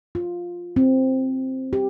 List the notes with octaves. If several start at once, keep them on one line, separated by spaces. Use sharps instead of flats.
F4
C4
G4